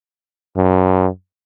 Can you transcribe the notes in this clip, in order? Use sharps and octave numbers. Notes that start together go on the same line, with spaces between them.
F#2